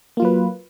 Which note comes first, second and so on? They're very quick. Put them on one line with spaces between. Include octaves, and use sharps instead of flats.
A#3 F4 F#3 B4